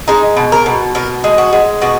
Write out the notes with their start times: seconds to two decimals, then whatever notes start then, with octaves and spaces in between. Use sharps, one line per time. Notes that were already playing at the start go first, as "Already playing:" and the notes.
0.08 G#3 D#4
0.36 B2
0.52 A#4
0.66 B2
0.95 B2 A#4
1.24 G#3
1.38 F#4
1.53 G#3
1.82 B2 F#4